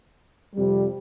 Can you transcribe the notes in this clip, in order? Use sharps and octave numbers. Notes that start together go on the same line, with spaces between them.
F2 C3 G3